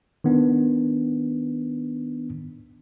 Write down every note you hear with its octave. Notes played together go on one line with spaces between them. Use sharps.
D#3 B3 D4